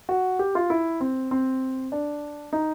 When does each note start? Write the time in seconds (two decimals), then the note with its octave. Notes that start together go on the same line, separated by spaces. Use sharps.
0.09 F#4
0.39 G4
0.55 F4
0.70 E4
1.01 C4
1.31 C4
1.92 D4
2.53 D#4